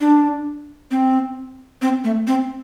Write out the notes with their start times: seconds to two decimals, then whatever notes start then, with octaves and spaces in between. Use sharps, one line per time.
0.01 D4
0.91 C4
1.82 C4
2.04 A3
2.27 C4